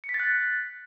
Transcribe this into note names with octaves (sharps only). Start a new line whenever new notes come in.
C#7
B6
A6
F#6